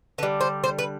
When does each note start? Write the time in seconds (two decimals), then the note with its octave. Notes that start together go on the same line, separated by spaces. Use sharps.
0.18 D3 B4
0.23 G3
0.41 C5
0.64 C5
0.79 B4